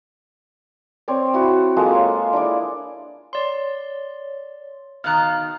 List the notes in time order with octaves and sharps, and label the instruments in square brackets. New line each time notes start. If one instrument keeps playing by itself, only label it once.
[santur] C4 C#5 D5
E4 F#4
G#3 A#3 F4 A4
C#5
D4 E4 D5
[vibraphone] C#5 [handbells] D5 C6
[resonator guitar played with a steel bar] B2 D#3 A#5 [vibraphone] F5 [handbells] F6 F#6